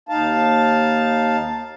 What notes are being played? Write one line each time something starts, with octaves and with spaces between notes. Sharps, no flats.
D#2 D#4 F5 A5